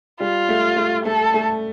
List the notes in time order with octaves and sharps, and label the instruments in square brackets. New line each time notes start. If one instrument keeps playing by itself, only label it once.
[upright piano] G3 [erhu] F4
[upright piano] A3
A3
[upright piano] A3 [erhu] A4
[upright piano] A3